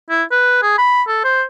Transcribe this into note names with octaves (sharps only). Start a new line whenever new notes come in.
E4
B4
G#4
B5
A4
C5